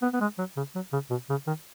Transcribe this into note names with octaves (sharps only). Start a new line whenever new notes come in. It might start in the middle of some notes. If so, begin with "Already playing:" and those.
B3
B3
G#3
F#3
C#3
F#3
C#3
B2
C#3
D#3